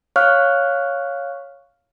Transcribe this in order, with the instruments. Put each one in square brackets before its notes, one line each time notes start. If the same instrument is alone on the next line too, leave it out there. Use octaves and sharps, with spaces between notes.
[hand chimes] C#5 F5 C#6 F6 F#6